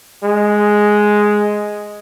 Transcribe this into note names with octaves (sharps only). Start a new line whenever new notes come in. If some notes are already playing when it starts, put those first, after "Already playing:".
G#3